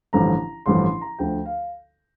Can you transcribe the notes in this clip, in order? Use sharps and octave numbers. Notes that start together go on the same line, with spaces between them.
A1 G2 D3 F3 A#5
A1 G2 D3 F3 C6
C6
A#5
D2 D3 F3 G5
F5